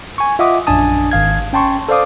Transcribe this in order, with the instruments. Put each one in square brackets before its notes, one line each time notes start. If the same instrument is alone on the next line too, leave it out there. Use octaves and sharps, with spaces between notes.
[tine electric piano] G#5 C#6
F4 D#5 E5 F#5 D6 D#6
A#1 F#2 D4 G#5 A5 D#6
G#1 F5 G#6
C#4 G5 A5 C6 C#6
A4 C5 D5 F5 D6 D#6